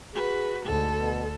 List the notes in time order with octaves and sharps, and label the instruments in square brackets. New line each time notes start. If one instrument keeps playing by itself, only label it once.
[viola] F#4 B4 [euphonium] G#4
[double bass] D2 [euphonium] G#2 [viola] A4
[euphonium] B2